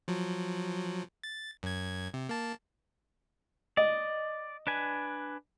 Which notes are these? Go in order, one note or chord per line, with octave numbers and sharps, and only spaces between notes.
F3 F#3
A6
F#2 G#6
C3
A#3 A5
D5 D#5
D4 B4 G#5